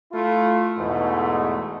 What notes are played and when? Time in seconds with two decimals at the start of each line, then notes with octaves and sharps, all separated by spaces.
0.12 A3 E4 F4
0.78 E2 G#2 B2 A3